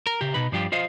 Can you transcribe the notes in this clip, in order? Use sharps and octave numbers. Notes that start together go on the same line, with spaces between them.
A#4
C#3 G4
B2 D#4 B4
G2 F3 D4 F4 G4
F4 C5 D#5 F5